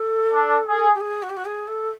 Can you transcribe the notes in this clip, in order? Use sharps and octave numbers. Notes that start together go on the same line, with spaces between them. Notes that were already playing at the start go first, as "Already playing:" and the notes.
Already playing: A4
D4
G#4
G4
G#4
F#4
G4
F#4
G#4
A4